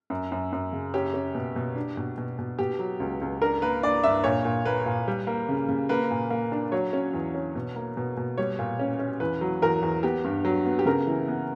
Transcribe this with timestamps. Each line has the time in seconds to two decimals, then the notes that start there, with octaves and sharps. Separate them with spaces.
0.10 F#2
0.32 F#2
0.53 F#2
0.73 C#3
0.94 C#4 G4
1.14 C#4
1.35 B2
1.56 B2
1.76 D4
1.97 B2
2.18 B2
2.39 B2
2.59 B2 G4
2.79 F#3
3.00 C#2
3.21 C#2
3.42 D4 A#4
3.62 A#3 B4
3.83 D4 D5
4.04 G2 E5
4.24 A#2 C#5
4.45 A#2
4.65 A#3 B4
4.86 A#2
5.08 G3
5.27 A#3
5.49 C#3
5.69 C#3
5.89 A#3 B4
6.11 A#2
6.30 A#3
6.52 D4
6.72 F#3 C#5
6.93 C#4
7.13 E2
7.35 C#4
7.55 B2
7.76 A#3
7.97 B2
8.17 B2
8.38 G3 C#5
8.59 A#2
8.80 C#4
8.99 C#4
9.20 E2 B4
9.41 F#3
9.62 E2 A#4
9.83 E2
10.03 B3 G4
10.25 G2
10.45 F#3
10.66 B3
10.79 G4
10.86 C#3 A#4
11.07 E3
11.28 B3